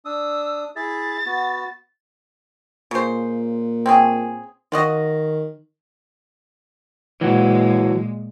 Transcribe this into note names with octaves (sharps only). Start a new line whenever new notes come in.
D4 D#6 E6
E4 G#4 E5 A6
B3 F#4
A#2 C#3 C5
C4 C#4 G#4
D#3 F4 F#4 D#5
A#2 E3 F#3 G#3 F#4